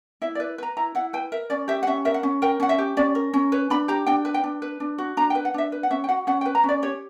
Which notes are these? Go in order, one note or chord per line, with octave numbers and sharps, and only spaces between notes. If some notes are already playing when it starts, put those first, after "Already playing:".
E4 E5
D5
B4
B4 A#5
E4 A#5
E4 F#5
B4 G5
A#4 E5
C#4 D5
G4 E5
F#5
C#4 E5
A#4 E5
F#5
C#4
A#4 G5
C#4 F#5
E5
G4
C#4 D5
A#4
C#4
B4 C#5
D4 B5
G4 A#5
D4 G5
B4
G5
D4
B4
D4
F#4
D4 A#5
G5
B4
F#5
D4 E5
B4
F#5
C#4 E5
G5
F#4 F#5
C#4 F#5
G5
B4
A#5
C#4
D5
G4 C#5